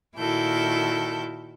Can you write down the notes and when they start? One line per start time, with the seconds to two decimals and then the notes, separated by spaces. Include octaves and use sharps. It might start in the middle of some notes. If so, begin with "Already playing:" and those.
0.18 A#2 D#3 E4 F#4 A4 G6